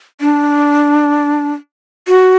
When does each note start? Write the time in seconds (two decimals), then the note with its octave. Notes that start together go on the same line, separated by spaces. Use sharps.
0.21 D4
2.08 F#4